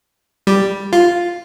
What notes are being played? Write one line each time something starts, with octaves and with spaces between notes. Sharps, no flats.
G3
F4